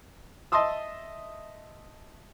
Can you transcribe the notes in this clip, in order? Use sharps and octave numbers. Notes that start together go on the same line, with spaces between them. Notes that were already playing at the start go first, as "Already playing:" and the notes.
D#5 E5 A5 C6 D#6 E6